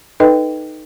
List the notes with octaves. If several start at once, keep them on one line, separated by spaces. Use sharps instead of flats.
D#4 A4 B4 D#5 G5